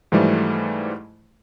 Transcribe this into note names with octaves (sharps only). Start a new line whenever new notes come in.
G#2 E3 F3 G3 A3